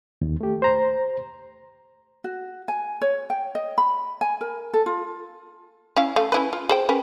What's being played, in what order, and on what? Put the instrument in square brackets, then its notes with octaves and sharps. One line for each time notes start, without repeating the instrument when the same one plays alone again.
[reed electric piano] D#2
A3 G4
C5 A#5
[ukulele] F#4
G#5
C#5
G5
D#5
B5
G#5
A#4
A4
F4
[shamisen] C#4 E4 F5
A3 F5
C#4 E4 B4
F4
G#4 C5 G5
C#4 A#4 B4